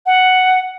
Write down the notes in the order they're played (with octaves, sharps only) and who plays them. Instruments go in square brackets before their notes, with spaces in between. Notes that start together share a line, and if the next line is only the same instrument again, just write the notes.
[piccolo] F#5